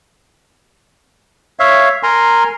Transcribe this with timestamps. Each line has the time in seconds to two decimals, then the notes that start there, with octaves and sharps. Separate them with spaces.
1.60 C#5 E5 F5
2.03 A#4 G#5 A#5 C6